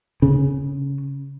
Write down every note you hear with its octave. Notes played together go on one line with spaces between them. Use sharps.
C#3